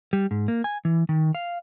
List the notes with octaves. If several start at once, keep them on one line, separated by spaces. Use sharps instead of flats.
G3
G#2
A#3
G#5
E3
D#3
F5